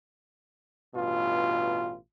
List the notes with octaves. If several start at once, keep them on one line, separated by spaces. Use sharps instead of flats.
A1 G2 B2 F4